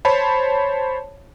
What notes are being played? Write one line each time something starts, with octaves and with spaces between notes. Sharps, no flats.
C5 C#5 A5 B5